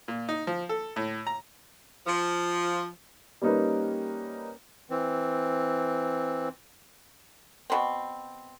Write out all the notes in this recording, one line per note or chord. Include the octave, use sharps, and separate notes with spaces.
A#2
D#4
F3
A4
A2
A#5
F3
G3 A#3 C#4 D#4 A#4 B4
E3 C4
B2 C4